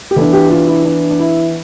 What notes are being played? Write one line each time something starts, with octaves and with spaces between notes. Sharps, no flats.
G4
E3 B3 D4 A4
G4
F4
E4
D4
D4
E4